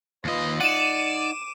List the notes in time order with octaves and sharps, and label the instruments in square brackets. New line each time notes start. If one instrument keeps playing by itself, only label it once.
[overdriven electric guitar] D#2 D#5 [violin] F4 B4
[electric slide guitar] D#4 F#5 [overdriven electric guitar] D5 [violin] C#7 [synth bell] D#7 E7
[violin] D6